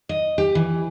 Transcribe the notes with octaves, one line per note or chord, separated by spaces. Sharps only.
D#5
G4
E3